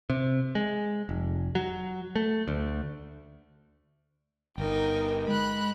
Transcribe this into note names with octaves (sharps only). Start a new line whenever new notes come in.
C3
G#3
F1
F#3
A3
D2
G1 D#4 A#4 G5
G#3 B5 F#6